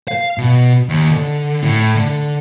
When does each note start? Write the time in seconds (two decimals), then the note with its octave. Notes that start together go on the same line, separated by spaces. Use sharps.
0.08 F5
0.38 B2
0.89 D#2
1.11 D3
1.62 A2
1.95 D3